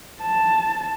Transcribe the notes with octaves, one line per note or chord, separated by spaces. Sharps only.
A5